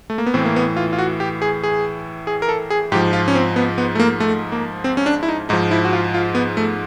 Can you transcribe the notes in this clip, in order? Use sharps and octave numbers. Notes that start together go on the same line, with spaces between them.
A3
A#3
B3
A2 E3 C4
A#3
B3
F4
F4
F#4
G4
G#4
G#4
G#4
A#4
A4
G#4
G#2 F3 G4
F4
C#4
C4
B3
B3
A3
A#3
A3
A#3
C4
C#4
D4
E4
D#4
G#2 F3 D#4
E4
F#4
F4
F4
B3
A3